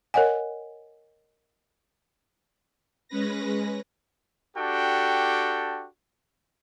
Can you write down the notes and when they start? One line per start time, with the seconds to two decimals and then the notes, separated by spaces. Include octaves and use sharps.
0.14 A#4 C#5 D#5 F#5 G#5
3.08 G#3 C#4 B4 A#6
4.56 D4 F#4 G4 A4 G5